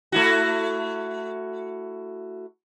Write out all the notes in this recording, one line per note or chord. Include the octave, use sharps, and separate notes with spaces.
A3 E4 F#4